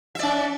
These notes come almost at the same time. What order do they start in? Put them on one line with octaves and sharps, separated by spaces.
E5 D5 C#4